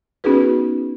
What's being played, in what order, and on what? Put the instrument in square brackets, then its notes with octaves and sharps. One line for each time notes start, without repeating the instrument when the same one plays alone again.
[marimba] B3 C#4 D#4 F#4 G#4 B4